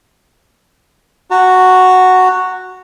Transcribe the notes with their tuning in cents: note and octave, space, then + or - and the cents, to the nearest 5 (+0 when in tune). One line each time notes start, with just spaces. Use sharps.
F#4 +0 A#5 -40